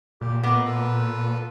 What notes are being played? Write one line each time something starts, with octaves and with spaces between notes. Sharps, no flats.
A#2 G4
B3 A#4 D#5 F5 D6
F4 A4 B4